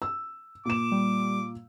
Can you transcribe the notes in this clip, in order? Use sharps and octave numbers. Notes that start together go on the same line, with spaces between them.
E6
A#2 D6 E7
G3